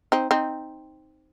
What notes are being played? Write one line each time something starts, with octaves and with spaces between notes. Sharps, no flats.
C4 D#4
C4 D#4